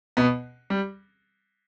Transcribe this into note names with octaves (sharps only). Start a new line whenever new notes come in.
B2 B3
G3